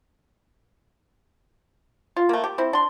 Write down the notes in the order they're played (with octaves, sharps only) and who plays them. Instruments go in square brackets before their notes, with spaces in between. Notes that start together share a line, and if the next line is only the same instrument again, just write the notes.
[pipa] F4
A3 A#3
G4
C4 E4
D4 C6